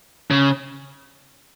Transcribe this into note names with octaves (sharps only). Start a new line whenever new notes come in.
C#3